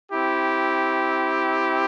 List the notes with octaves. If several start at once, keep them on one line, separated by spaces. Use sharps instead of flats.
C4 E4 G4